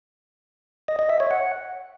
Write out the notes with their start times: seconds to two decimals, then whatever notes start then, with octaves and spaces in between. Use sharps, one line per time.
0.88 D#5
0.99 D#5
1.10 E5
1.20 C#5
1.31 F#5